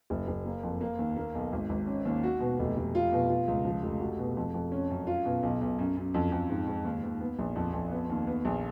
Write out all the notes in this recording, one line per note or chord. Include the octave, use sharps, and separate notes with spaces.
F#1
F#1
A#3
F2
A#3
D#2
A#3
B1
G#1
G#1
C#4
D#2
F#4
B2
F1
F1
F4
B2
F4
C#2
F3
F1
F#4
B2
F2
F2
C#4
F#2
F4
B2
B1
B1
F#2
F#2
F2
F2
G#2
G#2
D#2
D#2
B3
A#1
F2
F2
B3
D#2
B3
A#1